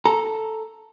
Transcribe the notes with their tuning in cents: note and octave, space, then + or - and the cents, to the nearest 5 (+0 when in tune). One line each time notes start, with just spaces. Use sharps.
A4 +0 A#5 +0